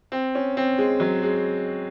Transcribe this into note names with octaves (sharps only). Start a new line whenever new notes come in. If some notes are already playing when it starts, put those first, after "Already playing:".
C4
C#4
C4
G#3
F#3
G#3